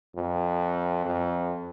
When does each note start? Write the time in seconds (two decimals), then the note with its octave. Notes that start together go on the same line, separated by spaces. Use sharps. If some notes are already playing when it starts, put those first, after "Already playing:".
0.16 F2
1.05 F2